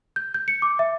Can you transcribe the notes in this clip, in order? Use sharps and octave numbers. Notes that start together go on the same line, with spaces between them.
G6
G6
C#7
D6
E5